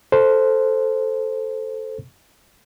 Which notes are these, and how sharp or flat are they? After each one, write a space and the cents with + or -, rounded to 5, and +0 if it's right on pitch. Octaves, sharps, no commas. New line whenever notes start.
A4 +0 C5 +0